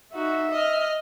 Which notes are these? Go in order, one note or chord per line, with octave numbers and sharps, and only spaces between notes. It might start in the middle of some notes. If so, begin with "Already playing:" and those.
D#4 F#4 E5
D#5 F6